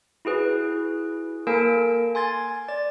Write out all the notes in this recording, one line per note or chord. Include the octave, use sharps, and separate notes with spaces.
E4 F#4 G#4 B4
A#3 A4 A#4 G#5 D7
G#5 C6 G#6 A6
D5 A6